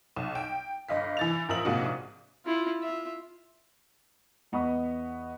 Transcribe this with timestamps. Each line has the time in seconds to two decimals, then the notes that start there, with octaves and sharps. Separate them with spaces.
0.16 B1
0.35 G5
0.89 G1 D#5 F5 B6
1.17 E3 A6 F7
1.49 A1 F3 A#4 E5 D#6 F#7
1.65 A#1 G#2 C3 A#3 F4 F#4
2.46 E4 F4
2.81 F4 E5
4.52 E2 B3 D#5 B5 C#6 D#6